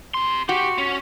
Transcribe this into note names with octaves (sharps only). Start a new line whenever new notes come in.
C3 C6
F#4 G4
C#4